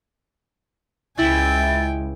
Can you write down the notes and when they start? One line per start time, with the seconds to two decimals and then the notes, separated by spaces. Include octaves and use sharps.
1.18 C#2 E4 G5 G#5 A6